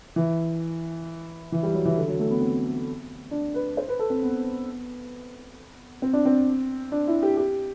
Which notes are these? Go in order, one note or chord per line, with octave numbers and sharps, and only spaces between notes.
E3
E3
G3
F#3
E3
D3
F#3
A3
B3
C4
D4
B4
C5
B4
A4
C4
B3
C4
D4
C4
D4
E4
G4
G4